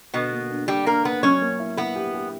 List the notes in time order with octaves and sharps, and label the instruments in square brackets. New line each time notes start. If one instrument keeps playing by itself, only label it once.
[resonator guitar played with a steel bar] B2 B3 [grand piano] D3
[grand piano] A#3
D4
[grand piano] D3 [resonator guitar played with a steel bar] G3 G4
[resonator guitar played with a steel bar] A#3 A#4 [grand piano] D4
[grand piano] A#3 [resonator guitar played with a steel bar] B3 B4
[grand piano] F#3 [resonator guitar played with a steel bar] C#4 C#5
[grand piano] A#3
E4
[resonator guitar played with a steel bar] B3 B4 [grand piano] E4
[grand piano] G4
G4